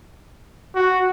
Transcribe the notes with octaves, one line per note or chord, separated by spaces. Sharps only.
F#4